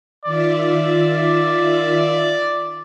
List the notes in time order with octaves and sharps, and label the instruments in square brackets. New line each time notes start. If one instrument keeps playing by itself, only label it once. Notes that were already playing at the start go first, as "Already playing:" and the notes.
[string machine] D#3 F4 E5 [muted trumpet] D5